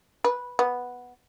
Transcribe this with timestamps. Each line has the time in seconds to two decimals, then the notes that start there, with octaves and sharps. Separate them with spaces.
0.24 B4
0.59 B3